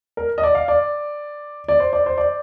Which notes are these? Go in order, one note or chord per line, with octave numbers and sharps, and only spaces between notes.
A#4
D#5
D5
F5
D5
D5
C5
D5
C5
D5